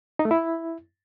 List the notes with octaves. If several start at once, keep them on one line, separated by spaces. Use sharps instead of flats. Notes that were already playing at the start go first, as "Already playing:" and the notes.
D#4
A3
E4